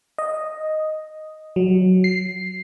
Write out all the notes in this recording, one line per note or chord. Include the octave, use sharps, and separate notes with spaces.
D#5
F#3
C7